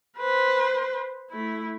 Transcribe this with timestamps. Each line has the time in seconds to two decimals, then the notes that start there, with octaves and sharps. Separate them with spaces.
0.18 B4 C5
1.30 A3 E4